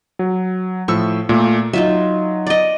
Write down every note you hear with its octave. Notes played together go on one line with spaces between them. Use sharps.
F#3
A2 F3 C#6 E6
A#2 A3 A#3
F#3 D#4 F4 E5
D5 D#5